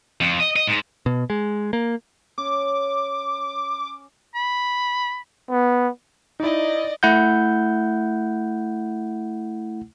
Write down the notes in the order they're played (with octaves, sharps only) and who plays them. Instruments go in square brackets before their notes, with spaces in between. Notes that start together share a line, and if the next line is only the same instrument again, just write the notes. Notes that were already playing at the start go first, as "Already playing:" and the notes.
[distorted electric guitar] F2
D#5
D#5
G#2
[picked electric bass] B2
G#3
A#3
[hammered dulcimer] C#4 [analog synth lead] D6
[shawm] B5
[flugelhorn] B3
[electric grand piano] D#4 E4 [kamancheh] D5 D#5
[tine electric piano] A3 E4 F#5 G6